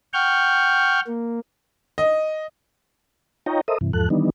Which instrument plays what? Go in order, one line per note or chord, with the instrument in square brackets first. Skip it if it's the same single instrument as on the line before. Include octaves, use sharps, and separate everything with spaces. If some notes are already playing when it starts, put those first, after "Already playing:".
[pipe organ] F#5 G5 C#6 F6 G6
A#3
[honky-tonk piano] D#5
[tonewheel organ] D#4 F4 C#5 D#5 G5 A#5
A4 A#4 C5 D#5 E5 D#6
G2 C3 E3
E2 G#2 F3 A4 F#6
D#3 E3 G3 B3 D4 D#4